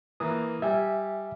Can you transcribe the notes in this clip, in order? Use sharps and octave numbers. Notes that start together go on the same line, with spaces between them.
E3 A#3 D#6
G3 E5 G#5